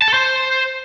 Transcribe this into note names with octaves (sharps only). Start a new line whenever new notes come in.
A5
A4
C5